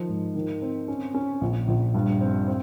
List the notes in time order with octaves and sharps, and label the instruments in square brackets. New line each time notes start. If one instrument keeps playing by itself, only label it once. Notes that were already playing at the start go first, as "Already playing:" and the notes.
Already playing: [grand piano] D#3 F3
G#2
D#3
C4
C#4
C#4
A#1
A#1
G2
C4
C4